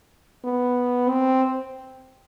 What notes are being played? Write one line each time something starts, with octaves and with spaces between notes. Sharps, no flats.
B3
C4